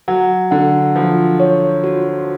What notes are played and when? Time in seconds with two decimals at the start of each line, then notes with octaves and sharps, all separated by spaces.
0.08 F#3 F#5
0.51 D3 F#5
0.96 F3 F4
1.40 C#5
1.84 F#4